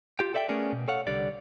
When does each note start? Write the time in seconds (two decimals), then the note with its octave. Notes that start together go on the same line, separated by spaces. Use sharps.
0.19 F4 G4 G5
0.34 A4 D5 E5 F#5 G5
0.49 A3 B3 C#4 G#4 A#4 D5
0.73 B2
0.88 A4 C#5 F5 F#5
1.07 C2 D3 G3 D5